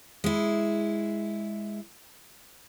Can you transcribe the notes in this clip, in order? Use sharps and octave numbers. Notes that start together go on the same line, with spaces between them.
G#3 E4